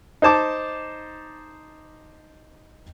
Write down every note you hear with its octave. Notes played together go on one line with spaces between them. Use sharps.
D#4 C5 A5 D6